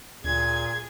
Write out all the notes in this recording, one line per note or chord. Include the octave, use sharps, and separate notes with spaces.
D2 A#2 G#4 G#6